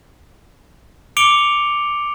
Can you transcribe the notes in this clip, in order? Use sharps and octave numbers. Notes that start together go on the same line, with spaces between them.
D6 C#7 D7 F7 G7